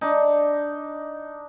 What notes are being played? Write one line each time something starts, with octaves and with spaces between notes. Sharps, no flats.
D4 D#4